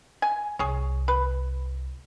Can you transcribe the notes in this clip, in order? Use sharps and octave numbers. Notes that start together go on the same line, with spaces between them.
G#5
C2 G#4 C#5
B4